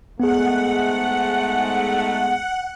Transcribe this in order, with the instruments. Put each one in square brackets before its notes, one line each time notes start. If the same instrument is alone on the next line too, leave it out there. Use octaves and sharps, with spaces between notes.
[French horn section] G#2 G#3 A3 [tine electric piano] B3 G#4 [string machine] F#5